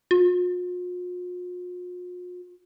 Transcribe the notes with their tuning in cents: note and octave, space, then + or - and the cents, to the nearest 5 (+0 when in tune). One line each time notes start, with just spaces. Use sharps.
F4 +45